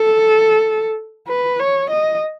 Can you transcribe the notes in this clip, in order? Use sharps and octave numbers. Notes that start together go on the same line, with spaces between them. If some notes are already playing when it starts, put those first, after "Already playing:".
Already playing: A4
B4
C#5
D#5